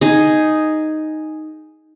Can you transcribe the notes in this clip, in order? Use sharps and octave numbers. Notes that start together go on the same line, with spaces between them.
D#4 G#4